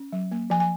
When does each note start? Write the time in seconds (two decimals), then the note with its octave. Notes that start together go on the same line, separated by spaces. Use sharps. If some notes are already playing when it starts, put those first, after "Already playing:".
Already playing: C#4
0.13 F#3
0.32 A#3
0.50 F3 G#5
0.60 G#5